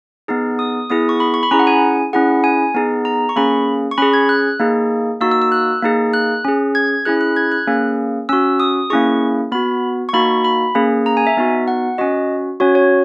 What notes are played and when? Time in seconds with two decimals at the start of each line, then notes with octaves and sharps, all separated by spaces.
0.28 B3 D#4 G#4
0.59 D#6
0.90 B3 E4 G#4 D#6
1.09 C#6
1.20 B5
1.34 C#6
1.43 B5
1.51 C#4 E4 G#4 A#5
1.59 F#5
1.67 G#5
2.13 C#4 E4 G#4 F#5
2.44 G#5
2.75 B3 D#4 G#4
3.05 A#5
3.29 C#6
3.36 A#3 C#4 G#4 B5
3.91 C#6
3.98 C#4 G#4 B5
4.13 G#6
4.29 F#6
4.59 A#3 D#4 G#4
5.20 A#3 D#4 F#4 E6
5.31 E6
5.42 E6
5.52 F#6
5.83 A#3 D#4 G#4
6.14 F#6
6.45 C#4 G#4
6.75 G#6
7.05 C#4 E4 G#4 F#6
7.21 F#6
7.36 G#6
7.52 F#6
7.67 A#3 C#4 G#4
8.29 C#4 F#4 E6
8.60 D#6
8.90 A#3 C#4 E4 G#4 C#6
9.52 B3 F#4 B5
10.09 C#6
10.13 A#3 D#4 F#4 B5
10.45 B5
10.75 A#3 C#4 G#4
11.06 A#5
11.17 G#5
11.27 E5
11.37 B3 D#4 F#4
11.68 F#5
11.98 C#4 F#4 D#5
12.60 C#4 F#4 C#5
12.75 C#5